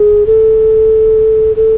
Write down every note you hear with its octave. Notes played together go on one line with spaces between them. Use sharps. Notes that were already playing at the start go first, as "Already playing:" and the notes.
Already playing: G#4
A4
A4